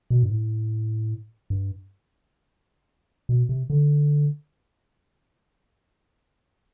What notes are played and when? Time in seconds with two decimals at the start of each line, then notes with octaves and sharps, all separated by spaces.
0.10 B2
0.23 G2
0.30 A2
1.50 G2
3.29 B2
3.49 C3
3.70 D3